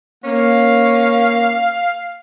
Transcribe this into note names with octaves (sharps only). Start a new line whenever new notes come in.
A#3 C#4 F5